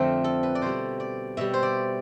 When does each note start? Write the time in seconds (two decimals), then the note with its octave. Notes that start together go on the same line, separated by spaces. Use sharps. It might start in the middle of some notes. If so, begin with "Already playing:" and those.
Already playing: F2 D3 F3 A3 C4
0.24 A4
0.43 B4
0.55 D5
0.61 B2 G3 C5
1.00 D5
1.37 B2 G3 E5
1.53 C5
1.63 D5